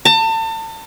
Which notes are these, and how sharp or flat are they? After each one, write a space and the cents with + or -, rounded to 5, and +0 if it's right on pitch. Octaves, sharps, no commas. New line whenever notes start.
A5 +35